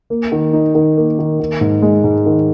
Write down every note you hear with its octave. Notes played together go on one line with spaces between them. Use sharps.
A#3
D#3
D#4
D#3
A#3
D#3
D#3
G#2
G#3
G#2
D#3